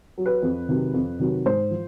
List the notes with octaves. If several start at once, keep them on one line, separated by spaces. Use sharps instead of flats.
F#3
B4
F2
C3 D#3 F#3
F2
C3 D#3 F#3
G#2 C5
F3